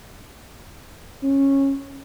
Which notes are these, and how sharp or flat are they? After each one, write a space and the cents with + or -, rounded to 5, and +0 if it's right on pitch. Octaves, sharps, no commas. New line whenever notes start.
C#4 -15